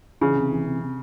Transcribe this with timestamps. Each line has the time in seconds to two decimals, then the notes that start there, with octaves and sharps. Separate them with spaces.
0.21 C#3 E3
0.36 C3
0.51 E3
0.66 C3
0.81 C3